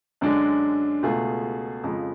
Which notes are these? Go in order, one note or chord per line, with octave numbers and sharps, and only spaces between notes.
F#2 D3 G#3 D4
C#2 B2 A3 F4 G#4
F2 C#3 F3 G#3